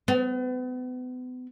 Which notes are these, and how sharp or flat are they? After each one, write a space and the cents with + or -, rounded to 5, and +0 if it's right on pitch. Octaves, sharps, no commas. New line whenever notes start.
B3 +35